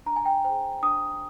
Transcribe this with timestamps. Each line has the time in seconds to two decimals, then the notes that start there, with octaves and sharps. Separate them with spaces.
0.06 D4 A#5
0.16 G#5
0.25 G5
0.44 C5 G5
0.49 G#4
0.83 D4 D#6